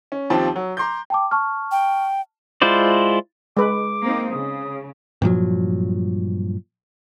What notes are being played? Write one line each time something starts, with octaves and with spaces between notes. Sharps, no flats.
C#4
D#2 F3 C4 G4 A5
F#3
A#5 C6 D6 G6
G5 A5 D6
A5 C#6 F6
G5
G#3 E4 F4 C5 D5
G#3 B4 D6
A#3 C4 D#4
C#3 D#6
G2 A#2 F3 F#3